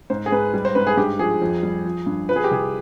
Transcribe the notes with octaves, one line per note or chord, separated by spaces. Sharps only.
G#2 C5
G#4
G#2 B4
G3
C5
G#2 B4
G#4
G2 G4
F3 G#4
F2
G3
F3
G2
F3 B4
G#4
G4
C2 G#4